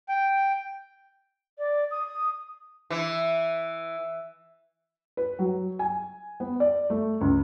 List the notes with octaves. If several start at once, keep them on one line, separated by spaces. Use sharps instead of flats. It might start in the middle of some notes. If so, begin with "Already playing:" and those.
G5
D5
D#6
E3
B4
F#3
G#5
B3
D5
A3
C#2